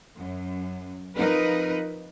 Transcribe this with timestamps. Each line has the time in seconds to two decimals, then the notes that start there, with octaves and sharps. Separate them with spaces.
0.17 F#2
1.19 F3 C4 D#4 A#4 B4